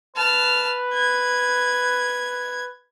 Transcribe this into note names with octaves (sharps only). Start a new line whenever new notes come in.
B4 A5 F6
G#6